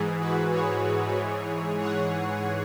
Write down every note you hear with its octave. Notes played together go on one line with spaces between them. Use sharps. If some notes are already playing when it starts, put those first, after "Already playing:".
Already playing: G#2 E3 G#4
F#4 B4
G#4 C#5
G#2 E3
C#5 F#5